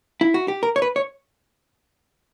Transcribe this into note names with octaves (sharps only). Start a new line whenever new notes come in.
E4
F#4
G4
A#4
C#5
B4
C#5